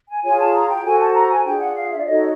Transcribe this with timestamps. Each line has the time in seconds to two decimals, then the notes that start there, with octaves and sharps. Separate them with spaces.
0.09 G#5
0.23 F4 G#4 C#5 G#5
0.39 A5
0.54 A#5
0.69 G5
0.84 F#4 A4 C5 G#5
0.99 A5
1.14 A#5
1.30 G#5
1.45 D4 F4 G#4 G5
1.60 F#5
1.75 F5
1.90 E5
1.99 D5
2.05 D#4 F#4 A4 C#5 D#5